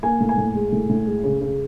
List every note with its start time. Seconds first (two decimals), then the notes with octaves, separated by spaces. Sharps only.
0.03 A#3 G#5
0.20 A2
0.29 G#5
0.38 A2
0.55 G#3
0.73 A2
0.89 A2
1.06 G#3
1.24 C#3
1.41 C#3